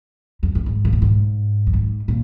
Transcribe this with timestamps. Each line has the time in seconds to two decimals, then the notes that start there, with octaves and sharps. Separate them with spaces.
0.43 F2
0.55 F2
0.66 G#2
0.85 C#3
0.93 A#2
1.02 G#2
1.67 F2
1.73 G#2
2.08 A#2